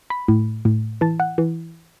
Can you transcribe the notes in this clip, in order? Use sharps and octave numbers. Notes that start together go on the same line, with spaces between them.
B5
A2
A2
E3 A5
F#5
E3